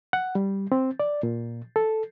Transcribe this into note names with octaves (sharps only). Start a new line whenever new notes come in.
F#5
G3
C4
D5
A#2
A4